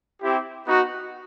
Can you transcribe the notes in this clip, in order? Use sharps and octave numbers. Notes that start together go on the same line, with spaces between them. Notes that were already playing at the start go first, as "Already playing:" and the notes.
C4 E4 G4
B3 D#4 F#4